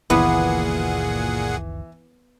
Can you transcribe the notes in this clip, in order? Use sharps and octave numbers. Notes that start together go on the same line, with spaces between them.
F#1 C#2 A#2 D#3 E3 B3 G#4 F#5